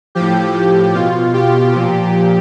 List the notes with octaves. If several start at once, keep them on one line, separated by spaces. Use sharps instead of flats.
A2 F3 G4
B2 F4
G4
A#2 F3